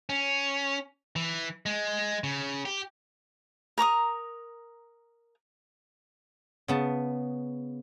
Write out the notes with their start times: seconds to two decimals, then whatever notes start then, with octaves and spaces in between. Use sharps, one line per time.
0.09 C#4
1.16 E3
1.66 G#3
2.24 C#3
2.65 G4
3.78 A#4 A#5 C#6 D#6
6.68 C#3 B3 A5